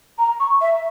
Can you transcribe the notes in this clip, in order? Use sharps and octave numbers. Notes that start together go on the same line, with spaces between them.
A#5
C#6
E5